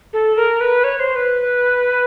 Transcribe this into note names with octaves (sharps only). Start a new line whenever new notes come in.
A4
A#4
B4
C#5
C5
B4